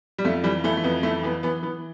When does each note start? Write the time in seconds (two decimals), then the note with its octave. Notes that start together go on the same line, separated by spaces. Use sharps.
0.19 G3
0.24 F2 A3
0.44 E3 G3
0.64 E3 A3
0.77 A3
0.84 F2 B3
1.03 E3 A3
1.23 E3 B3
1.43 E3 B3
1.63 E3 B3